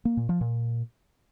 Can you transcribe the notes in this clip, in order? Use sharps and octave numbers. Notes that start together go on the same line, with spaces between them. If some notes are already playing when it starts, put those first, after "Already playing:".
A#3
A#2
F3
A#2